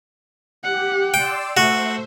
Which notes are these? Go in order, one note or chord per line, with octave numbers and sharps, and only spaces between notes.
G4 F#5
D5 G5 C6 E6
A3 F#4 C5 E5